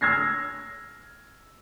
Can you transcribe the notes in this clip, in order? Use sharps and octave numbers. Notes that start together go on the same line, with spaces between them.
E6 F6 G#6 A#6 C7